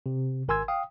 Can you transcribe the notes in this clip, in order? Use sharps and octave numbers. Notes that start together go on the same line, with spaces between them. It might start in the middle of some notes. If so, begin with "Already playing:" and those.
C3
G#1 A#4 G#5 C6 E6 G#6
F5 G5 D#6